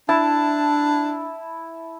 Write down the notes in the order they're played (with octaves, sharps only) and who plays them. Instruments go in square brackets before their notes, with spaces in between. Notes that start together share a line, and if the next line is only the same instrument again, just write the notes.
[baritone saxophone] D4 [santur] E4 A5